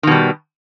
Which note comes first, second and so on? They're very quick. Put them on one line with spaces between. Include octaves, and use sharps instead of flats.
D#3 B2 G3